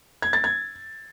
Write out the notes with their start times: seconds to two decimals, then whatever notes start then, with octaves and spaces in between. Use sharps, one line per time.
0.22 G#6
0.33 A6
0.44 G#6